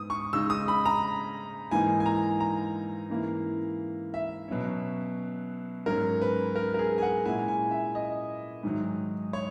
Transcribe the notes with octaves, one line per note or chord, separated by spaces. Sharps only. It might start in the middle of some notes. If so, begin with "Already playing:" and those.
Already playing: G#2 B3 D#6
C#6
C#3 G#3 D#4 E6
D#6
B5
A#5
G#2 E3 A#3 D#4 G#5
G#5
A#5
A#5
G#2 E3 A#3 C#4 E4
E5
B2 F#3 C#4
G#2 F#3 C#4 A#4
B4
A#4
A#4
G#4
G#5
F#5
A#2 G#3 C#4 E4 G#5
G#5
E5
D#5
G#2 D#3 F#3
C#5